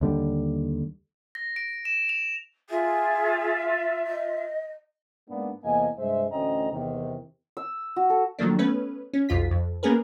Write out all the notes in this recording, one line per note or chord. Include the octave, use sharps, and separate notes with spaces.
D#2 D3 G3
A#6
D7
E7
F7
F4 G#4 E5
D#5
G#2 A#3 B3 D4
E2 C3 A#3 D#5 G#5
G2 C3 G#3 C5 E5
A1 D2 C4 C#4 D#5 A#5
E2 C3 D#3
E6
F#4
A4
D#3 F3 F#3 A3 A#3 D4
A3 B3 C#4 B4
C#4
B1 F2 F4 B6
F2
A#3 B3 C#4 G#4 A#4 B4